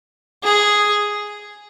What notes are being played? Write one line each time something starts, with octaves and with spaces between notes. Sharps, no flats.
G#4